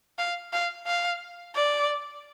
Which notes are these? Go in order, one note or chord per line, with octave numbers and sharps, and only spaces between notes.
F5
F5
F5
D5